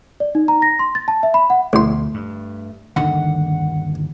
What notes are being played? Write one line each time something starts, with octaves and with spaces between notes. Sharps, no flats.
D5
D#4
A#5
A#6
C6
A6
A5
E5
B5
F#5
A1 D2 B2 F3 A3 C6
G2
G1 D#2 D3 D#3 D4 F#5